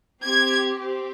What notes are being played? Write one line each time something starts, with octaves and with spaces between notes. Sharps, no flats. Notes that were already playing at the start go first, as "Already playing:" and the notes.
C4 G4 G#6
C4 G4